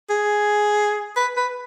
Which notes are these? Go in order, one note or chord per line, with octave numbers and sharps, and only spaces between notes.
G#4
B4
B4